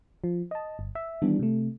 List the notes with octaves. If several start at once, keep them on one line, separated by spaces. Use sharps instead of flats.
F3
D#5 A5
G1
E5
D#3 E3 G3 B3 D4
C3 A3